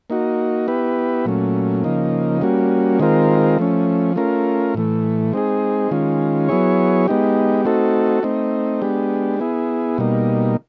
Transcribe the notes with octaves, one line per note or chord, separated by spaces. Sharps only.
A#3 D#4 F#4
B3 E4 G4 B4
A#2 F#3 A3 C#4
C#3 F3 A#3 D#4
G3 A#3 C#4 F#4
D#3 G#3 C4 F4 A#4
F3 A3 C#4
A3 C#4 F4 A#4
A2 E3 A3
G#3 C4 D#4 G#4
D#3 G#3 C#4 F4
F#3 B3 E4 G#4 C#5
G#3 B3 D#4 G4
A3 C4 D#4 F#4 A4
A3 C4 D#4
G#3 B3 D4 G4
B3 E4 G#4
B2 G3 A#3 D#4